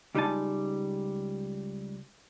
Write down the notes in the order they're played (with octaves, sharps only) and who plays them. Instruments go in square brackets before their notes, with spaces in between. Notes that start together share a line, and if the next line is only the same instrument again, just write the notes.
[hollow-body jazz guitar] C#2 G3 G#3 D#4 G#5 A5